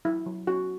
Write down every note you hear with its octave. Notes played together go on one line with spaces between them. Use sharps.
F#3 E4
F#3
C#4 F#4